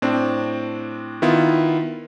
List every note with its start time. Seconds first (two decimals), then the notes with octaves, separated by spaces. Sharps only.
0.02 A2 C4 D4
1.22 D#3 B3 E4 F4